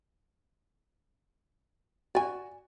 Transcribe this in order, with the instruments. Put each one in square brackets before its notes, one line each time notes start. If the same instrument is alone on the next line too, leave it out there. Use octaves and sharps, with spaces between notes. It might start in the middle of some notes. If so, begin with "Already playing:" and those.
[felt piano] F#4 [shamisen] D5 G#5